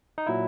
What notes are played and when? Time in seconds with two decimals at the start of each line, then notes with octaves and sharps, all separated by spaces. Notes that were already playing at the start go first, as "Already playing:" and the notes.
0.18 D#4
0.27 A#2 F#3 E4